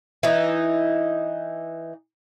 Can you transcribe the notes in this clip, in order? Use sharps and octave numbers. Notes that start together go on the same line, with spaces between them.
E3 D#4